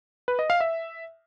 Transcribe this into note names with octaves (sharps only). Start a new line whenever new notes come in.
B4
D#5
F5
E5